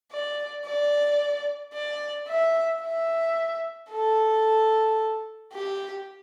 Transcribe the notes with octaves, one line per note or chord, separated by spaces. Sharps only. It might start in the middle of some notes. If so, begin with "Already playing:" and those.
D5
D5
D5
E5
E5
A4
G4